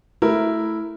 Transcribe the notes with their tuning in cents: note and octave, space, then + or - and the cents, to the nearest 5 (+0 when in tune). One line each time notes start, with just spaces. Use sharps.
A3 -5 E4 +0 A#4 +0